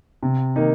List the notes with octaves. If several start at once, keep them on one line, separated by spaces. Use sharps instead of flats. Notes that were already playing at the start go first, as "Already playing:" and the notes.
C3
D#3 A#3 D#4